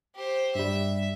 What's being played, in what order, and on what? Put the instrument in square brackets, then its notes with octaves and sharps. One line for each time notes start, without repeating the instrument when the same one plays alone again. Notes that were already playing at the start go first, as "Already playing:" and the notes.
[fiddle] G4 C5
[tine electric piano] G2 G3 [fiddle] E5